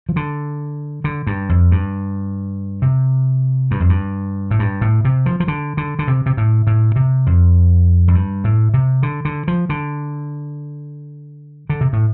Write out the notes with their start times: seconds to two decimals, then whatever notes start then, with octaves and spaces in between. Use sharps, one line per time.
0.09 F3
0.16 D3
1.04 D3
1.27 G2
1.49 F2
1.72 G2
2.82 C3
3.71 G2
3.80 F2
3.89 G2
4.51 A2
4.59 G2
4.81 A2
5.05 C3
5.26 F3
5.40 F3
5.48 D3
5.77 D3
5.99 D3
6.08 C3
6.26 C3
6.37 A2
6.67 A2
6.96 C3
7.26 F2
8.08 F2
8.14 G2
8.44 A2
8.74 C3
9.03 D3
9.25 D3
9.48 F3
9.69 D3
11.70 D3
11.81 C3
11.93 A2